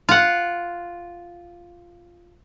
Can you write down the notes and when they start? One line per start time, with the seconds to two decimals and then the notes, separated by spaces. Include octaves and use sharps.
0.09 F4 F#5